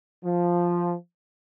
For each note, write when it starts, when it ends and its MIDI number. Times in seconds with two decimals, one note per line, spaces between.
0.24 0.94 53